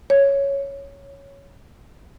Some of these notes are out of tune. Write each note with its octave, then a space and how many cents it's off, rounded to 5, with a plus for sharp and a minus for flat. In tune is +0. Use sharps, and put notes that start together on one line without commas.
C#5 +0